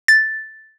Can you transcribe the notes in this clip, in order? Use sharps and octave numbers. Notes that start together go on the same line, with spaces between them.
A6